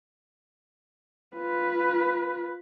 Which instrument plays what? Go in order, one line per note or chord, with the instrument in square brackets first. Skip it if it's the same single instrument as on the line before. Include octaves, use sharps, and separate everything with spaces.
[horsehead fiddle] F4 B4